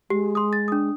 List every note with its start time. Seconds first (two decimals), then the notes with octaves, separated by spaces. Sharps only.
0.10 G#3 G4
0.35 C6 D#6
0.53 A6
0.68 D4 D#6